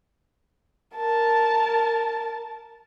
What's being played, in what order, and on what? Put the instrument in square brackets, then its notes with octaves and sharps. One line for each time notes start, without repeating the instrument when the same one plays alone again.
[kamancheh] A#4 A5